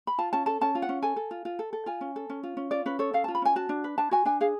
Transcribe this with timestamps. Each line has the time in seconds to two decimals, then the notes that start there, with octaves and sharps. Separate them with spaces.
0.07 B5
0.18 F4 A5
0.33 C#4 A5
0.46 A4 A5
0.61 C#4 A5
0.75 F4
0.82 F#5
0.89 C#4
1.02 A4 G#5
1.16 A4
1.31 F4
1.45 F4
1.59 A4
1.73 A4
1.86 F4 G#5
2.01 C#4
2.16 A4
2.30 C#4
2.43 F4
2.57 C#4
2.71 F4 D5
2.86 C#4 B4
2.99 A4 C#5
3.14 C#4 F5
3.24 A5
3.28 F4
3.35 B5
3.42 C#4 G#5
3.56 F#4 A5
3.69 D4
3.84 B4
3.98 D4 A5
4.11 F#4 G#5
4.25 D4 G#5
4.41 G#4 F5